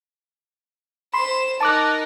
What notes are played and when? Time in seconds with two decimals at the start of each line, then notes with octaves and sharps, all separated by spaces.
1.14 C5 B5 C6 E7
1.61 D#4 A#4 A5 D6 F#6